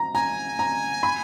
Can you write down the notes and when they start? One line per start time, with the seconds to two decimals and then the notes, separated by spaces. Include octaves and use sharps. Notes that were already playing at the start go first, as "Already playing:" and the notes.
Already playing: A#5
0.15 G#5 A#5
0.59 A#5
1.03 B5